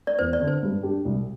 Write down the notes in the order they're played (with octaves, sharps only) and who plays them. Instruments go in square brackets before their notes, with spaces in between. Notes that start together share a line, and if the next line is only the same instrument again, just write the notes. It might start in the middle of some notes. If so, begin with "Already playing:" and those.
[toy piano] D5
[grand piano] E2 [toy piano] C5
[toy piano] D5
[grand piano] D3 C4
[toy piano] C5
[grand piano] G2
G3 D4 G4
C2